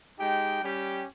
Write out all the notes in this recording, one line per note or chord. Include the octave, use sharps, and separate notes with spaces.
G#3 D#4 G4 G5
G3 C#4 G4